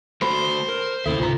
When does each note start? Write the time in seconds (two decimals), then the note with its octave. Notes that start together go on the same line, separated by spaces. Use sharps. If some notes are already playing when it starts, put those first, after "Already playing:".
0.22 A3 F#4 C5 B5
0.69 A#4
1.06 D#2 A2 C#3 E4 A4 E5
1.20 G#1 C#2 G#2 C3 F4 B4 A#5